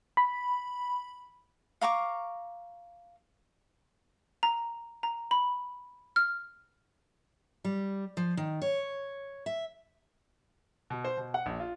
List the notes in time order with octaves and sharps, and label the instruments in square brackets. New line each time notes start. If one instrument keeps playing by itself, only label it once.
[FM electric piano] B5
[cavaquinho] F5 A#5 C#6 D6
[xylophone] A#5
A#5
B5
F6
[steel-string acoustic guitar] G3
F3
D#3
C#5
E5
[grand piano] B2
C5
B2
F#5
A#1
F4